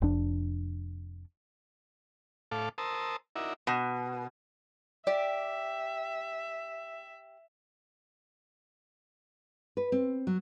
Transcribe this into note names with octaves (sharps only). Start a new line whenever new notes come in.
F1 F2 D4
A2 A4 F5 D6
A#4 C5 A5 D#6 E6
D#4 E4 F#4 A#4 D5 E5
B2
G4 D5 E5
B4
C4
F#3